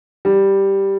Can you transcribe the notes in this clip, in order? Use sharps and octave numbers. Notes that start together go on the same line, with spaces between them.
G3